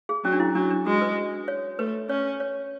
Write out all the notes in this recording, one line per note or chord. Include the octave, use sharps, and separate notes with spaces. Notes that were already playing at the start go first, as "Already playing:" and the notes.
G#4
F#3 C#4
D4
E4
F#3 D4
D4
G#3 F#4
B4
C#5
A3 B4
C#4 C#5
C#5